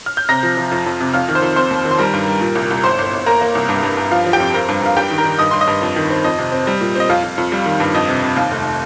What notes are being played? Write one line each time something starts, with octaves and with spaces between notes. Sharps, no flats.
F6
G6
C3 A#5 A#6
F3
F3
F2
F2
C3
F2 F5 F6
D#3
C5 C6
F2
C4 C5 C6
D#2
D#3
C6
G3 A#4 A#5
G2
G3
A#2
C2
C2
G1 C5 C6
G1
G1
A#3 A#4 A#5
A#3
C2
G2
G2
G2
F3 F5
F3
G4 G5
F2
C4 A#4 A#5
G2
G2 F5
G3 G4 G5
D#3
A#4 A#5
D#3
G2 D#5 D#6
G2 C6
D#5 D#6
G2
F2
D#3
C4
F2 D#5
C3
C4
G3
A#2
C4 D#5
F2 F5
F2
F2
G3
D#3
G2
F2 D#5
C3
C3
D#2 F5
F1